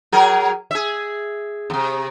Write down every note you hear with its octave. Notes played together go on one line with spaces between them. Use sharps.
F#3 G#4 A#4
G#4 E5
E2 C3